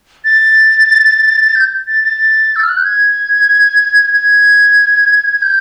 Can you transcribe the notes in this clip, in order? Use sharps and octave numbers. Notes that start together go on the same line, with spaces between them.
A6
G6
A6
A6
E6
F6
F#6
G6
G#6
G#6
G#6
G6